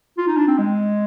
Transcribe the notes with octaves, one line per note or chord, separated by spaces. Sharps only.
F4
D#4
D4
C4
G#3